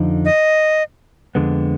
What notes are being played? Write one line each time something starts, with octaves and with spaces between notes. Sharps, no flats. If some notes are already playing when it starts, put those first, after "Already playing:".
Already playing: F2 D3 F3 D#4
D#5
F2 D3 G#3 B3